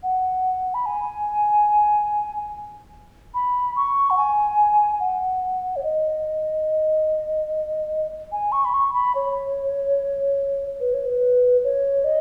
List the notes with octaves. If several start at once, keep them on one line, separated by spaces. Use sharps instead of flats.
F#5
B5
G#5
B5
C#6
F#5
G#5
F#5
C#5
D#5
G#5
C#6
B5
C#6
B5
C#5
B4
C#5
B4
C#5
D#5